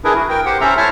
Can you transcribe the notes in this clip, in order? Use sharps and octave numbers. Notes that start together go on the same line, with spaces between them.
D4 E4 G#4 A#4 B4
F#4
A#4 G5
G4 C5 F#5
C#4 A4 C5 E5 A#5
E4 C5 C#5 E5 A5 F6